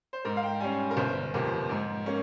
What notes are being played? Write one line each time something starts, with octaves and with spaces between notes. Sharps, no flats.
C5
G#2 A#4
F5
G5
G3 C#4 G#5
A#4
G1 C5
F2 C3 F3 A#3
G#2
A#3 C#4